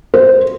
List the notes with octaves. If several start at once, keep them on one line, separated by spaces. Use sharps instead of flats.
C5